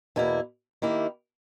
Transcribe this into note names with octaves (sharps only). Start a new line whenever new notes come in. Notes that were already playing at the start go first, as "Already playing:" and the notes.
E2 B2 A#3 E4
D#3 A#3 E4 G4